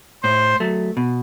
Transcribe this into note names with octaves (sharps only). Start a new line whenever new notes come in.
A2 C5
F#3 A3
B2